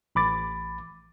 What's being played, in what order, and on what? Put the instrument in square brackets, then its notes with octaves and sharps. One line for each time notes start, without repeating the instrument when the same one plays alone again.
[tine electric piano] A1 B5 D6 A6